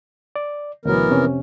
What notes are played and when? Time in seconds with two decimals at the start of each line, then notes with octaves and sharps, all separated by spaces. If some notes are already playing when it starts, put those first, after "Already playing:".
0.36 D5
0.85 D2 B2 E3 F#3 B3 A#4
1.10 F2 C3 C#4